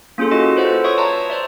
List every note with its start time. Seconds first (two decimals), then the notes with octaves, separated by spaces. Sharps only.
0.18 A#3 C#4 F4 G#4 A4
0.31 E4 F#4 D#5
0.56 F4 A4 B4 C5 D5 F#5
0.84 C#5 E5 C#6 D#6
0.97 B4 D5 A5 A#5 C6
1.30 C5 D5 E5